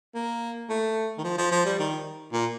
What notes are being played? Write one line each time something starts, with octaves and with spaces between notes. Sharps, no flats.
A#3
A3
D#3
F3
F3
F3
G3
D#3
A#2